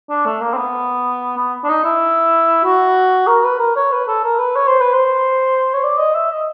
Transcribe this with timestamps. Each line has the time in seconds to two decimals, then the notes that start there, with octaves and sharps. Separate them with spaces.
0.09 D4
0.26 A3
0.41 A#3
0.54 C4
0.57 B3
1.37 B3
1.64 D4
1.69 D#4
1.84 E4
2.64 F#4
3.27 A#4
3.44 B4
3.59 A#4
3.76 C#5
3.92 B4
4.08 A4
4.24 A#4
4.39 B4
4.56 C#5
4.68 C5
4.81 B4
4.93 C5
5.74 C#5
5.83 D5
5.98 D#5
6.14 E5
6.31 D#5